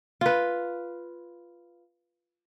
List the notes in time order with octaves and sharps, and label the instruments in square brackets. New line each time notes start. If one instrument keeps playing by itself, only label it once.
[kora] F4 B4